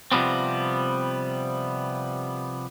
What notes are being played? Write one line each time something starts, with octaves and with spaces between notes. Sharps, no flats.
C3 F3 G3 B3 C4